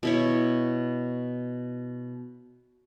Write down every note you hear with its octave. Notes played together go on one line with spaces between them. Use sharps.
B2 E4 C#5